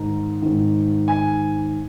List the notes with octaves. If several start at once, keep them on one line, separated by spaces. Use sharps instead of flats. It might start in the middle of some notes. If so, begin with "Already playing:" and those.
Already playing: G#2 D#3 A#5
G#2 D#3
G#5